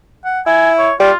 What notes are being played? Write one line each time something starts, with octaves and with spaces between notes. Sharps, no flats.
F#5
E4 G#5
C#5
G3 F4